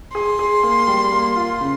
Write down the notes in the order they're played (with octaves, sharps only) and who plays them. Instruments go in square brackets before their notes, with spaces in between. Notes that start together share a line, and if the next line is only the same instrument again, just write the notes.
[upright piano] G#4 [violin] C6
[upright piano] G#4
A#3
G3
A#3
F4
C#3